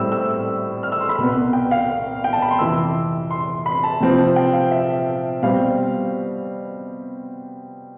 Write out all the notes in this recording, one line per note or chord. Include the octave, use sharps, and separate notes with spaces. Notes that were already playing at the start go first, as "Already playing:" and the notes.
Already playing: A2 G3 C4 E6
E6
F6
E6
C6
B5
C2 B2 B3
G5
F5
G5
A5
B5
C6
F2 C3 E3 E6
C6
B5
A5
C3 F3 C4
G5
F5
E5
B2 G3 C4 F5